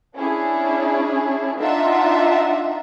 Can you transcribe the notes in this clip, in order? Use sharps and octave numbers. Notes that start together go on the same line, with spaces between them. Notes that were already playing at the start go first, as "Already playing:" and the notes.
C#4 D4 E4 G#4
D4 D#4 F4 E5 F#5